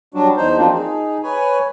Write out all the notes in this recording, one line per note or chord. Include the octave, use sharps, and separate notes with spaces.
F#3 G3 D4 F#4
E2 D#4 C5
F3 F#3 A#3 C4 D4 F4
D#4 G#4
B4 C#5 G#5